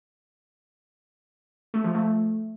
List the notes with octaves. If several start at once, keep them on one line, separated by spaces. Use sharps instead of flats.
A3
F3
A3